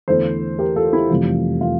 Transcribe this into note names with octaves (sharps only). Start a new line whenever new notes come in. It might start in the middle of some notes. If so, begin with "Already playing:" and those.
E2 D3 A3 E4 A4 C5
G4 A#4
F4 A4
E4 G4
F1 F2 E3 G3 F4
F4